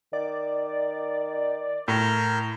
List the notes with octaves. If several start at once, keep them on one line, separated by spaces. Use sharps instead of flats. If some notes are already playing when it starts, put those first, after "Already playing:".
D#3 D5
A2 A#4 F6 G6